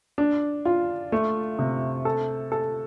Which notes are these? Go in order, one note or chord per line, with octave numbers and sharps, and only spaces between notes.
D4
F4
A3
C3
A4
A4